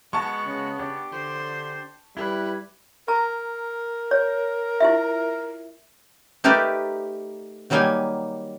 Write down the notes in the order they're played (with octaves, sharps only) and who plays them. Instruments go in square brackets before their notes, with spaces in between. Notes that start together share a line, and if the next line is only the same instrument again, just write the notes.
[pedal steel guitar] G#3 F#4 [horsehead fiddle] B3 [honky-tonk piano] A5 C#6
[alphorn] C#3
[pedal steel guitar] D4 G4
[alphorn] D3 [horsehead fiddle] C5
[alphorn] G3 [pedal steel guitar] E4 [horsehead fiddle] B4
[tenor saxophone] A#4 [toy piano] A#5
[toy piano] C#5
E4 F4 E5
[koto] A3 D#4 G4 A#4 B4 D5
D#3 F#3 G3 A#3 D#4 G#5